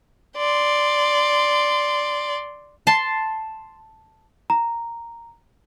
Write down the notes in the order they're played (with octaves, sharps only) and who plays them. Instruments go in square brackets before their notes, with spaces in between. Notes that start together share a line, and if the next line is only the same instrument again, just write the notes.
[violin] D5 C6
[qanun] A5 C6
[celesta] A#5